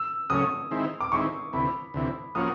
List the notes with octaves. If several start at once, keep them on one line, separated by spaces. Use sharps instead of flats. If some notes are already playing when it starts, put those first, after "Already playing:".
Already playing: E6
C#3 F#3 A3 C#4 D#6
D#3 G#3 C4 E4
D6
D#3 G#3 C4 E4 C#6
D2 C3 E3 B5
D2 C3 E3
F3 A#3 C#4 F#4 D#6